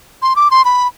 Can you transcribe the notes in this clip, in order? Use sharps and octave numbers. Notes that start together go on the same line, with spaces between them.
C6
D6
C6
B5